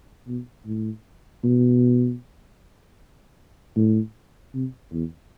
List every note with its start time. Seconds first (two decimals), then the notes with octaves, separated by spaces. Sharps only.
0.28 B2
0.66 A2
1.44 B2
3.76 A2
4.54 C3
4.93 E2